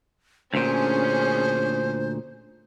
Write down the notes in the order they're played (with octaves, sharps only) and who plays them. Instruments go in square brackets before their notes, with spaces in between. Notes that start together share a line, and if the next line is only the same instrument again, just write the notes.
[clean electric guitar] D2 A#2 [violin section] C#4 D4 G#4 [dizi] C5